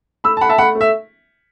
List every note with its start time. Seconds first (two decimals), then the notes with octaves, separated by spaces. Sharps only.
0.24 A3 B5 E6
0.37 A5
0.41 A3 F#5 B5
0.49 E5 A5
0.58 A3 F#5 B5
0.75 A3
0.81 E5